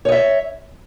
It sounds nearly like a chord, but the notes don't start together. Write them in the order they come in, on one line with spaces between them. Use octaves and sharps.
C#5 D#5 E5